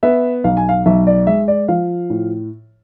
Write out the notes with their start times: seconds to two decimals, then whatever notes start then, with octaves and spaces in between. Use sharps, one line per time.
0.03 B3 E5
0.44 B1 F5
0.57 G#5
0.69 F5
0.86 B1 E5
1.07 D5
1.27 G#3 E5
1.48 D5
1.68 F3 F5
2.10 A2